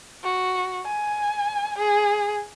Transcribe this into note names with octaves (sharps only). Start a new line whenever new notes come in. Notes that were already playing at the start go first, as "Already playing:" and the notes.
F#4
G#5
G#4